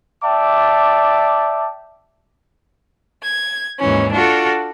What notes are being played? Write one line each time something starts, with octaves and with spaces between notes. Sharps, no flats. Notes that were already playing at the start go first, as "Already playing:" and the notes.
D5 E5 G5 A5 D6
G#6
D#2 G#2 E3 C#4
D4 F4 F#4 A4